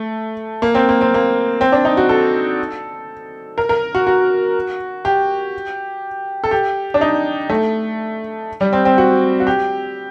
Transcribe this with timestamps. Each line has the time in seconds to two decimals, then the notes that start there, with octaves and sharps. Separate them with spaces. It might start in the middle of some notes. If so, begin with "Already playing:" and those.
Already playing: A3
0.62 A#3
0.75 C4
0.89 A#3
1.01 C4
1.14 A#3
1.61 C4
1.72 D4
1.85 D#4
1.97 F#4
2.09 A4
3.58 A#4
3.69 A#4
3.95 F#4
4.07 F#4
5.05 G4
6.44 A4
6.51 G4
6.94 D4
7.01 D#4
7.50 A3
8.61 G3
8.73 C4
8.85 C4
8.98 F#4
9.40 F#4
9.47 G4